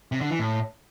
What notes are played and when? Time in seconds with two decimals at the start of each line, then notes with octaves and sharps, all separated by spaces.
0.12 C3
0.21 D3
0.30 E3
0.39 A2